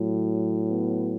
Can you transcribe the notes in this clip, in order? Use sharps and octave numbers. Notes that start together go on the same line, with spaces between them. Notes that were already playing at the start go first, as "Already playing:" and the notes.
Already playing: A2 F#3
B3